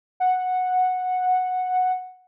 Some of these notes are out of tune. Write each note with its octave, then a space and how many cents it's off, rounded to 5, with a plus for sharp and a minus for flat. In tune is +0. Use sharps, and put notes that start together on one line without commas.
F#5 -10